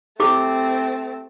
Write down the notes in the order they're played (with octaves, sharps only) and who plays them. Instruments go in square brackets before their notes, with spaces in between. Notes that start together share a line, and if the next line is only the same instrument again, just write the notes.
[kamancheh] A3 C4 [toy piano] E4 G4 D6